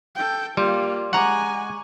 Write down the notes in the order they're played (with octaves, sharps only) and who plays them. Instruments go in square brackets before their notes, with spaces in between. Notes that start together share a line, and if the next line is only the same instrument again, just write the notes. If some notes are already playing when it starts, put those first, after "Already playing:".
[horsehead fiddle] A4 G5
[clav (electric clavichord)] G3 [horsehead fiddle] A#3 F4 [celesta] C6
[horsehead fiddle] G#3 G#5 [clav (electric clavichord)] F#5 A#5 [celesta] C#6 D6